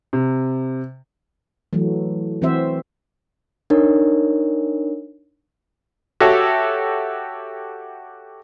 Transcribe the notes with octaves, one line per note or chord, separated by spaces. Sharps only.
C3
E3 F#3 A3
E3 C4 F#4 C5 E5
D4 D#4 A#4 C#5
F#4 G4 A4 C#5 E5